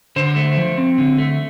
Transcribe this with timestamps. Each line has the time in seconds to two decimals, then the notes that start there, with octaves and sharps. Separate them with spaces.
0.16 D3 C5
0.36 A3
0.57 F3
0.77 C4
0.98 D3
1.18 A3